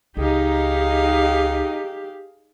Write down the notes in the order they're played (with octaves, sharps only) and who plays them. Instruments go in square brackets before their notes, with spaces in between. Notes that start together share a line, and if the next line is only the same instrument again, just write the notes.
[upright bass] C#2 [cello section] D#4 [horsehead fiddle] G4 [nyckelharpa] G#4 F5